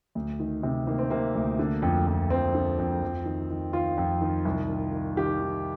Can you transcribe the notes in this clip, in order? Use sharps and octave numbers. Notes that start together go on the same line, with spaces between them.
D2
D#3
C3
D#3 A#3
C4
C3 A#3
D2
D3
F2
F2
F2 C4
D3
F2
F2
D#3
D#3
D#3 F4
F2
D#3
C2
D#3
D#3
D#3 G4
D#3